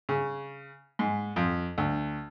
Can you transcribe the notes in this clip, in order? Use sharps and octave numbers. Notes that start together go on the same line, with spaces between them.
C#3
G#2
F2
D2